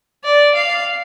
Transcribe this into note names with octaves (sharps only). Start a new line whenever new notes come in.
D5
F5